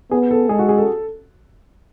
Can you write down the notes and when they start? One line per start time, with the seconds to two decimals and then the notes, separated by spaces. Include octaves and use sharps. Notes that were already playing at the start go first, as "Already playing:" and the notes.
0.11 B3 G#4
0.31 A4
0.49 G#3 G#4
0.59 F#4
0.69 G#4
0.78 A4